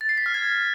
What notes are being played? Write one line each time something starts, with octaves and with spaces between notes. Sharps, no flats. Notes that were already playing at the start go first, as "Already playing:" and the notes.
A6
C7
B6
F6
G#6